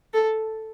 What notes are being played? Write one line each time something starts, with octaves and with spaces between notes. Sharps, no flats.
A4